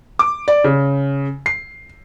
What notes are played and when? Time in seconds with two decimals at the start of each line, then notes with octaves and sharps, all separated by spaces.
0.19 D6
0.48 D5
0.64 C#3
1.46 C7